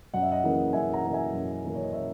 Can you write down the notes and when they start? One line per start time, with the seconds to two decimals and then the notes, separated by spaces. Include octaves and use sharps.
0.14 F#2 F#5
0.22 E5
0.31 D#5 F#5
0.44 C#3 E3 A#3
0.73 F#2 E5 G#5
0.93 F#5 A#5
1.04 C#3 E3 A#3
1.13 E5 G#5
1.33 F#2
1.63 C#3 E3 A#3
1.75 C#5
1.83 D#5
1.93 C#5 E5